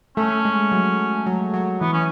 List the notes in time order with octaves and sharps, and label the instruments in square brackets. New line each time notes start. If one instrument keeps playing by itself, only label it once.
[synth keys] A3 [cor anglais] C#4
[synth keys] G#3
F#3
F#3
F#3
[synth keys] E3 [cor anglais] B3
[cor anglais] C#4